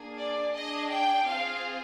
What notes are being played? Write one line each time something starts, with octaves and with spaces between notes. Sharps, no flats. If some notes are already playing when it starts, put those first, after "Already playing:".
Already playing: A#3 D4 G#4
D5
D4 G#4 D#5
G5
C4 F4 G#4 F5